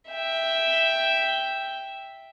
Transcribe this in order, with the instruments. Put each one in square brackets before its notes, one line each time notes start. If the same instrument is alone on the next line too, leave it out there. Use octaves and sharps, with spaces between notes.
[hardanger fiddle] E5 G5